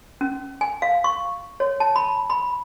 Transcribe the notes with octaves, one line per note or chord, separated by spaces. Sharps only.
C#4
G#5
F5
C#6
C#5
A5
B5
B5